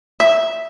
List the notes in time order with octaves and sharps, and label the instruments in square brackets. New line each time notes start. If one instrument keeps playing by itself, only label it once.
[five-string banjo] E5